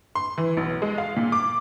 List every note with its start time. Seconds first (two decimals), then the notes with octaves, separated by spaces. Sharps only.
0.15 C6
0.38 E3
0.57 B1
0.82 G#3
0.98 F5
1.17 A#2
1.32 D6